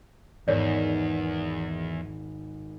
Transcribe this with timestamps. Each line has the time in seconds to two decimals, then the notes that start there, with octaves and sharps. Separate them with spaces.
0.48 G#1 E2 G#2 B3 A#4 C#5 D5